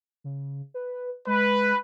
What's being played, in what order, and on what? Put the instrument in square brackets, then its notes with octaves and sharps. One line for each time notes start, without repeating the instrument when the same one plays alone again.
[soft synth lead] C#3
B4
[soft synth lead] G#3 [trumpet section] B4